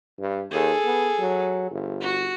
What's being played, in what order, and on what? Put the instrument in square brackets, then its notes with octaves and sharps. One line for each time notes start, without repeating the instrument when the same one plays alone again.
[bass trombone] G2
[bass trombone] D#2 [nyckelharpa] G#4 A4
[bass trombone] B3
F#3
G1
[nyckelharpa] F#4